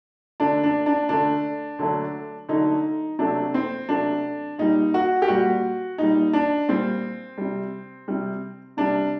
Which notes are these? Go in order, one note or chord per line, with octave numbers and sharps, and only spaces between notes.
D3 A3 D4
D4
D4
D3 A3 D4
D3 F#3 A3
D3 F#3 A3 D#4
C3 F#3 A3 D4
C4
C3 F#3 A3 D4
A#2 G3 D#4
F#4
G4
A#2 G3 F#4
A#2 G3 D#4
D4
A#2 G3 C4
C3 G3
C3 G3
C3 G3 D4